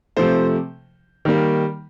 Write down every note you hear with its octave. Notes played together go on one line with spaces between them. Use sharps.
C3 F3 A3 C5
D#3 G3 A#3